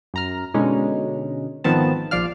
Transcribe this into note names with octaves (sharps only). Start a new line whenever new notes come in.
F#2 A#5 F6
B2 D3 G#3 C#4 D#4
G#1 D#3 F3 B3 C4 A5
A#1 F3 D5 F5 F6